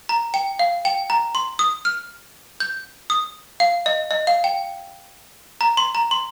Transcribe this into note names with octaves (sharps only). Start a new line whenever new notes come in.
A#5
G5
F5
G5
A#5
C6
D#6
F6
G6
D#6
F5
D#5
D#5
F5
G5
A#5
C6
A#5
C6